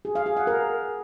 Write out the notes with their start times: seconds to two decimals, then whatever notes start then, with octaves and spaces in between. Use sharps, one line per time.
0.05 G#4
0.15 F5
0.26 G#4
0.37 F#5
0.47 A#4